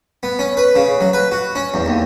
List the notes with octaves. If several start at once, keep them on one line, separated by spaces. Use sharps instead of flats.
B3
C#4
B4
C#3
F#3
B4
F#4
C#4
E2
D#2